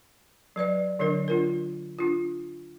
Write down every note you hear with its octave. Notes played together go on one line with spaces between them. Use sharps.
F#3 B4 D5 D#5
D3 F#3 D4 A#4 D#5
D4 F4 A#4
D4 F4